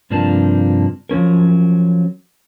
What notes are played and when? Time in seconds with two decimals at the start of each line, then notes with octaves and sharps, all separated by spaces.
0.10 G2 C3 F3 A#3 D4 A5
1.09 F3 F#3 C#4 A#4